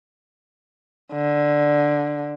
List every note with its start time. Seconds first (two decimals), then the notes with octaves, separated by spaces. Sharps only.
1.13 D3